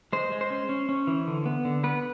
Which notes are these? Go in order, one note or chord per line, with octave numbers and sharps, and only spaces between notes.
G#3 C5
G#3
C5
C#4
C#4
C#4
E3
D3
B3
D3
B3 B4